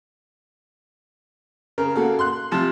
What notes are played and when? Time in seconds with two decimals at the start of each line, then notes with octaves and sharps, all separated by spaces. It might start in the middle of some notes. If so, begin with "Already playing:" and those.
1.78 C#3 A#4
1.96 A#3 F#4 A4
2.19 C6 F#6
2.52 C3 F3 A5